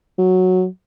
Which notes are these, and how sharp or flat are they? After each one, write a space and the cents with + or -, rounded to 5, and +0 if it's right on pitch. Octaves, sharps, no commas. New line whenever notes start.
F#3 -5